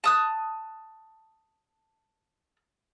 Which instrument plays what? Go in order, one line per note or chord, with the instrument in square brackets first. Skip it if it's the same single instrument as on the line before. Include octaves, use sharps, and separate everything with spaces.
[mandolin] A5 D#6 F#6